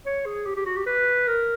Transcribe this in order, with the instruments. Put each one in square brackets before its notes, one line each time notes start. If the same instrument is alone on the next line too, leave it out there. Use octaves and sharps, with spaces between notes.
[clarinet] C#5
G#4
G4
G4
F#4
G4
B4
A#4